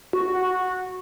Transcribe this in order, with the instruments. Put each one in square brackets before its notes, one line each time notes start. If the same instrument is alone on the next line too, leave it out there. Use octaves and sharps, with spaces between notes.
[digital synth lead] F#4
[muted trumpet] F#4